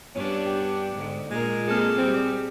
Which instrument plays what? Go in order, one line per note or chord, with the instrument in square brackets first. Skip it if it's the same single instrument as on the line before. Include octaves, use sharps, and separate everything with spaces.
[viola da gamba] G2 B3 D4 [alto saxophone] C#4
[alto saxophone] G4
[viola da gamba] G#2 [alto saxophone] D3
[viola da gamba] A#2 A#4 [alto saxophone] G#3
[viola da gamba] A#3 C4 A4 [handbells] G#4 F6
[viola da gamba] G3 [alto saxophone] C4